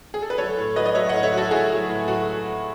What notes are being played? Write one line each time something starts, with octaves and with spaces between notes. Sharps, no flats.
G#4
A4
B4
F#3 A4 C#5
A2
F#3 B4 D#5
D#5
F#3 C#5 E5
A2 D#5 F#5
C#5 E5
F#3 F#4 A4
F#3 E4 G#4
F#3
A2
F#3 F#4